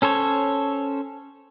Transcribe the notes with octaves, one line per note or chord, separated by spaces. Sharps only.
C#4 A4 C5 C#5